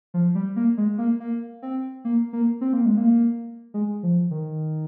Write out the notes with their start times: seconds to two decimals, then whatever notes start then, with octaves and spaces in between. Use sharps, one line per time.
0.14 F3
0.35 G3
0.56 A#3
0.78 G#3
0.98 A#3
1.20 A#3
1.62 C4
2.05 A#3
2.33 A#3
2.61 C4
2.73 A#3
2.86 G#3
2.97 A#3
3.74 G#3
4.03 F3
4.31 D#3